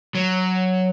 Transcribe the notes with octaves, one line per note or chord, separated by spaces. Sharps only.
F#3